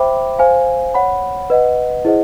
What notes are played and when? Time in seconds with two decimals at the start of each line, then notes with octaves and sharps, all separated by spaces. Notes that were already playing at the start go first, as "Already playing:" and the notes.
Already playing: C5 E5 G5 B5 D6
0.39 C5 F5 G#5
0.94 C#5 F#5 B5
1.50 B4 D#5 F#5
2.05 E4 G#4 C5 D#5 F#5